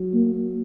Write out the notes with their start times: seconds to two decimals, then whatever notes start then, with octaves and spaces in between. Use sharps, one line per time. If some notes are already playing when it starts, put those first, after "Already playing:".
Already playing: F#3
0.14 A#3